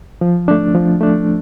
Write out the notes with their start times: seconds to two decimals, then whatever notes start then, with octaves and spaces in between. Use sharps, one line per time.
0.21 F3
0.48 A3 D4
0.74 F3
1.01 A3 D4